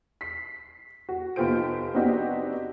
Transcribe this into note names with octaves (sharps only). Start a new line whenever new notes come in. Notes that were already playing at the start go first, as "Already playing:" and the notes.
B6 C7
F#4
F1 B3 F4 G4 C5 D7
B3 C4 D4 D#4 F#4 G4